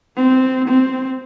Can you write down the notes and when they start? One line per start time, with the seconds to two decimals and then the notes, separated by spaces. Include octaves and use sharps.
0.16 C4
0.68 C4